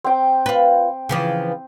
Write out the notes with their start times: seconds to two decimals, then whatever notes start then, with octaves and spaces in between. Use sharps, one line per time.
0.04 C4 G5
0.46 F4 B4
1.09 C#3 E3 F3